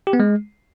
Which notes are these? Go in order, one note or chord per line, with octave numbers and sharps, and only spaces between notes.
G4
B3
G#3